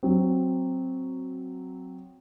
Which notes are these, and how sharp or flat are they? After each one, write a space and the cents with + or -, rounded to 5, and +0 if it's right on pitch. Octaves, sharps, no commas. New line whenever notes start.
F#3 +0 C4 +0